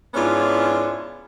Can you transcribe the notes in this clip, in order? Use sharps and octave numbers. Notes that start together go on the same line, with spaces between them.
G#2 B3 C#4 D4 E4 F4